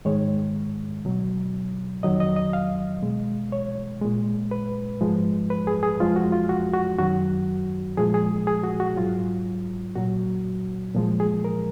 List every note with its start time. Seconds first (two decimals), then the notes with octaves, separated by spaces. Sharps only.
0.05 G#2 D#3 G#3 C#5
1.05 B2 F#3
2.03 F2 D#3 F#3 D#5
2.20 D#5
2.36 D#5
2.53 F5
3.03 B2 G#3
3.52 C#5
4.01 A#2 G#3
4.51 B4
5.01 G#2 F3 G#3
5.50 B4
5.67 G#4
5.83 G#4
6.00 F2 F3 G#3 F4
6.16 F#4
6.32 F4
6.49 F#4
6.73 F#4
6.99 F#2 D#3 F#3 F#4
7.97 A#2 F3 G#3 G#4
8.14 G#4
8.47 G#4
8.64 F#4
8.80 F#4
8.96 G#2 F#3 F4
9.96 A#2 F#3 F#4
10.95 A#2 F3 G#3
11.20 G#4
11.44 A#4